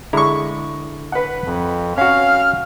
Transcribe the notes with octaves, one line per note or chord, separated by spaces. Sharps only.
D3 G#3 E4 A#5 C#6
B4 F#5
F2
C#4 F#4 F5 F6